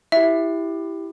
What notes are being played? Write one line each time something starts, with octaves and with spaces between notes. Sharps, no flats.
E4 G4 E5